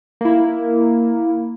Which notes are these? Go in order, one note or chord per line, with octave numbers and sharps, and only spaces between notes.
A#3 E4